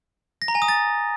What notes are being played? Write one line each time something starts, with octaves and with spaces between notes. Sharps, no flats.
A#6
A#5
G#5
D#6
A6